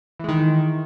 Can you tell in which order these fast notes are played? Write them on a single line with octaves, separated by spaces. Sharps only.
E3 G#3 D#3